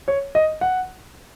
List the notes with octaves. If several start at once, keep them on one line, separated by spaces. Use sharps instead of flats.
C#5
D#5
F#5